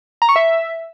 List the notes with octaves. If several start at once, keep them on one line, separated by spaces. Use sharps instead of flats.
A#5
C#6
E5